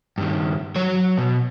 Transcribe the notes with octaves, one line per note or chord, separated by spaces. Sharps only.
G2 D#3
F#3 C#5
B2